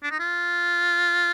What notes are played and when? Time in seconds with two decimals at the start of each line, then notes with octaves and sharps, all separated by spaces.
0.03 D4
0.11 D#4
0.19 F4